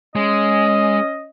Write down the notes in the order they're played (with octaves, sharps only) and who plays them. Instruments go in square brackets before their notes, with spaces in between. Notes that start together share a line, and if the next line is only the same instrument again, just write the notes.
[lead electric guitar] G#3 [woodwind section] C#4 D#5